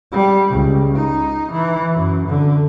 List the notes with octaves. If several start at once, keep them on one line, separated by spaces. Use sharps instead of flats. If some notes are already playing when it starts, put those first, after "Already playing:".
G3
C#2
D#4
E3
F#2
D3